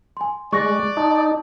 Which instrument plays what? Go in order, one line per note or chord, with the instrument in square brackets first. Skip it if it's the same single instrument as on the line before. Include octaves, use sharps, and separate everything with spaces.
[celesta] G#5 C6
[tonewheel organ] G#3 [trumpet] D5 [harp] C#6 F#6 A#6
[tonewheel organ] D#4 [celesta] A5